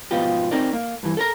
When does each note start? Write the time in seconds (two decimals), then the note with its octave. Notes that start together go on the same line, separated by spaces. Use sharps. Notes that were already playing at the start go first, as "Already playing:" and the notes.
0.11 G#2 B2 F3 B3 F4 G4
0.51 C4 D#4 A#4 D5
0.73 A#3
1.03 G2 E3
1.17 A4 A#4 A#5